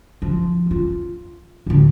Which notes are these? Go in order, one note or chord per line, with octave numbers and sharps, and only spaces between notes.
F3
F4
D2 A2